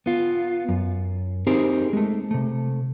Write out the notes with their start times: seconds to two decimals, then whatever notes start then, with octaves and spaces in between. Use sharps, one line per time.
0.06 B3 F4
0.69 F#2
1.47 C4 D#4 G4 G#4 A#4 C5
1.93 G#3 A3
2.31 C3 A3